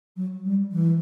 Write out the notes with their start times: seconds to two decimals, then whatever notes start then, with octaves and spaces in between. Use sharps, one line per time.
0.17 F#3
0.45 G3
0.72 E3